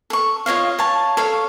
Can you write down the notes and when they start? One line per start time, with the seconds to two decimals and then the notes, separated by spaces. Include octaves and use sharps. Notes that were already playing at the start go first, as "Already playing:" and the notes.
0.10 A4 C#6
0.46 F4 C#5 D#5 F5
0.79 C#5 F5 A5
1.17 A4 C#5 F5